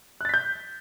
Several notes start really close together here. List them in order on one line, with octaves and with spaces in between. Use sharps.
F#6 A6 B6 G6